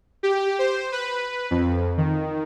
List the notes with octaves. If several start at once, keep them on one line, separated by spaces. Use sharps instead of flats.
G4
C5
B4
F2
D#3